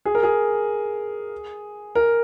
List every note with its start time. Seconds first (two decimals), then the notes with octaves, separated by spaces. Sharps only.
0.05 G#4
0.15 A#4
0.23 G#4
1.95 A#4